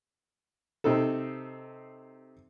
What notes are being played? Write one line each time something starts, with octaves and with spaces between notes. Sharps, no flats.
C3 C4 D#4 A4